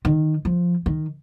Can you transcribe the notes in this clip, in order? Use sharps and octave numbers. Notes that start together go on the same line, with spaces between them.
D#3
F3
D#3